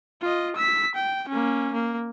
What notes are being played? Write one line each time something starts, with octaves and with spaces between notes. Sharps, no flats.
F4 D#5
E6 B6
G5
A#3 C#4
A#3